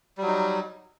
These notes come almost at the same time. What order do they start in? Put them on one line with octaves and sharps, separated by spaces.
G3 F#3 D#4